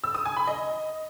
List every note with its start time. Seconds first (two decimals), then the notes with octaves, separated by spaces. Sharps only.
0.04 E6
0.15 D#6
0.26 G#5
0.37 B5
0.47 D#5